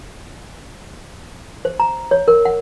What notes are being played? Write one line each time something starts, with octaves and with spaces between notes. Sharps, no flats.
C5
A#5
C#5
A#4
F#5